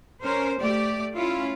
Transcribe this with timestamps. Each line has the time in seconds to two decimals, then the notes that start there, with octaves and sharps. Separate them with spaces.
0.22 C#4 A#4 C5
0.59 A3 G4 D5
1.14 C#4 E4 F4